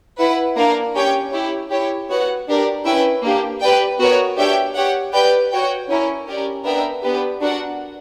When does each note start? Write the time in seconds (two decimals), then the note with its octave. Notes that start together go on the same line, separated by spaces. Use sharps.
0.18 E4 B4 F#5
0.56 A#3 D4 A#4 D5
0.94 C#4 G4 C#5 G5
1.32 E4 G4 C#5
1.70 E4 G4 C#5
2.09 B3 F#4 C#5 F#5
2.47 D4 G4 A#4 D5
2.84 C#4 E4 B4 E5 G5
3.22 A#3 D4 G4
3.61 G4 B4 D5 G5
3.98 B3 F#4 A#4 C#5
4.37 D4 G4 C#5 E5 G5
4.74 G4 C#5 F#5
5.13 G4 B4 D5 G5
5.51 F#4 C#5 G5
5.89 C#4 E4 A#4 C#5
6.26 C#4 G4 A#4 D5
6.64 B3 D4 A#4 E5 G5
7.03 B3 D4 G4 B4
7.41 D4 F#4 A#4 D5 F#5